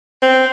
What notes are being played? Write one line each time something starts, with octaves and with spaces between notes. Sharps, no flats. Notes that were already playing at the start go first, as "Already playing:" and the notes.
C4